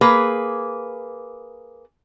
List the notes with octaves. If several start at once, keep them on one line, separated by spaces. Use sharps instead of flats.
A#3 G#4 B4